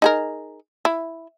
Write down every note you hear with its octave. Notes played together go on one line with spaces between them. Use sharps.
D#4 G#4 A#4
E4